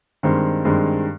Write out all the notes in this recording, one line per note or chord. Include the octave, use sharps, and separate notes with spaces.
G2 D#3 G#3 C4
G2 D#3 G#3 C4